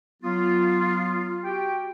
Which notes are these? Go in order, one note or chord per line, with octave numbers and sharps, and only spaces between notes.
F#3 B3 F4
F#4 G4 G5